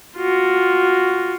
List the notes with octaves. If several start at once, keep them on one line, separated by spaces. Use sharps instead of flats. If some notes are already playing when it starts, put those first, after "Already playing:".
F4 F#4